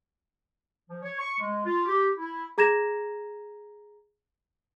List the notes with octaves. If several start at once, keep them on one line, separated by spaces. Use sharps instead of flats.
F3
C#5
C#6
G#3
F4
G4
E4
G#4 A#5 G#6 A#6 E7